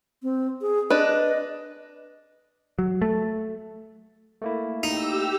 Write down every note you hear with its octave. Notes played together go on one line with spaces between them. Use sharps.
C4
G#4
D4 B4 D#5
F#3
A3
A3 A#3 E4
D#4 G4 E6